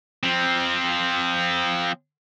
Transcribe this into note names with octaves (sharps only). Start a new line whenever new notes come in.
F3 C4